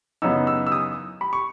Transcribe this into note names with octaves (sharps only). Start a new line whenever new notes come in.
F#2 C#3 E3 B3 D#4 E6
E6
E6
D#6
B5
C#6